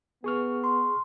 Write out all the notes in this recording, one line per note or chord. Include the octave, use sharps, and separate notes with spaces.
B3 G#4 C#6 F6
C6